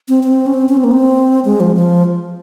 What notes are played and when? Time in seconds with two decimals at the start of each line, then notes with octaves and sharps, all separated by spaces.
0.09 C4
0.23 C4
0.46 C#4
0.54 C4
0.69 C#4
0.77 C4
0.84 A#3
0.91 C4
1.45 G#3
1.60 F3
1.75 F3